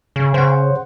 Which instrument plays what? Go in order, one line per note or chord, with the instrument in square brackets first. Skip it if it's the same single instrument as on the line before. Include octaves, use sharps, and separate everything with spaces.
[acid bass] C#3
[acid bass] C#3 [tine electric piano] C5 F#5